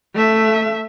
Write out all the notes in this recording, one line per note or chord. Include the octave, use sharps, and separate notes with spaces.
A3 E5